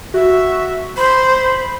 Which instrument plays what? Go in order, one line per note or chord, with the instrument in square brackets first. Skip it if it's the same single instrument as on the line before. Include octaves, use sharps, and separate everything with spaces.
[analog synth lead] F#4 [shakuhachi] E5
[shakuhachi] C5 [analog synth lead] B5